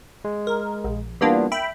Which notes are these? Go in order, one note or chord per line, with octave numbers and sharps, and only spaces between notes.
G#3
A#4
A#1
E3 G3 A#3 B3 D4 F4
E5 G5 B5